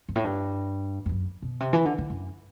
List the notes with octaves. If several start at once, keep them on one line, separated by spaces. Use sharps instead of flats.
G2
A2
G2
G2
F#2
B2
C3
E3
D3
D3
F#2